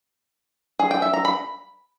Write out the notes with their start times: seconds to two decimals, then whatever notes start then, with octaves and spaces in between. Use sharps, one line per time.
0.79 G#4
0.91 G5
1.02 E5
1.13 A#5
1.25 B5